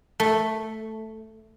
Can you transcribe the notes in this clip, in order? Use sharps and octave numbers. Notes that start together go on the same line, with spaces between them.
A3